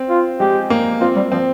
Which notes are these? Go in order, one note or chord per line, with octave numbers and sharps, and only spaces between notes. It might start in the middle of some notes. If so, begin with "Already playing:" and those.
Already playing: C4
F4
G#3 G4
A#3
C4 F4
G3
F3 C4